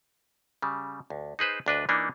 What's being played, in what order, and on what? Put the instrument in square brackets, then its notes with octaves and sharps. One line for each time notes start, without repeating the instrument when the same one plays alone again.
[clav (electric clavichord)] C#3 G3
D2
D#4 G#4 B4 C5
D2 D4 B4 D#5
E3 A#3 D4 D#4